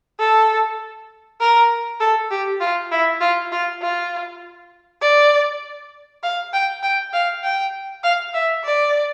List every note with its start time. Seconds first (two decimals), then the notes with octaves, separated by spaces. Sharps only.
0.20 A4
1.40 A#4
2.00 A4
2.31 G4
2.60 F4
2.92 E4
3.21 F4
3.52 F4
3.82 F4
5.01 D5
6.23 F5
6.53 G5
6.83 G5
7.13 F5
7.43 G5
8.04 F5
8.34 E5
8.64 D5